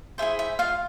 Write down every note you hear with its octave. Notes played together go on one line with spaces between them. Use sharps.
E4 G#4 C5 E5
E5
F4 F5